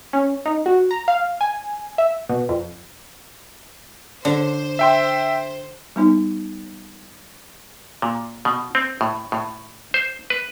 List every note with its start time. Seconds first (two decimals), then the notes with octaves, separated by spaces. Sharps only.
0.13 C#4
0.46 D#4
0.66 F#4
0.91 A#5
1.08 F5
1.41 G#5
1.98 E5
2.29 B2
2.49 F2
4.25 D3 C5
4.79 E5 G5 C6
5.96 G3 B3 D#4
8.02 A#2
8.45 B2
8.75 C4
9.01 A2
9.32 A2
9.94 C5
10.30 B4